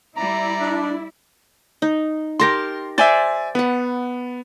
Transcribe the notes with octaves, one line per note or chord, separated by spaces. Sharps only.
G3 E4 D5 A#5
D4
D#4
G4 A#4 A5 C6 A#6
C5 D5 E5 G#5 A6
B3 B4 F#5